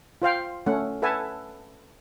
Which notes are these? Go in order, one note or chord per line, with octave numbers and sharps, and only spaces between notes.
F4 C5 F5 G5
A3 C#4 F#5
A4 B4 E5 F#5 G#5 A5